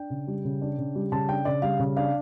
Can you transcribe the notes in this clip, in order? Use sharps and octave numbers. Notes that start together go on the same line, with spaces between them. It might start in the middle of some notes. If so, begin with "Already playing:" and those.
Already playing: D4 G5
C#3
G3
C#3
D4
C#3
G3
C#3 A5
D4 G5
C#3 D5
G3 F5
C#3
D4 F5